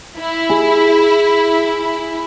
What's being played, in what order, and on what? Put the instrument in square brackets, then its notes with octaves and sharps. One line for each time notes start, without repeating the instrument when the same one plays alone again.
[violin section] E4
[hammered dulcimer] G#4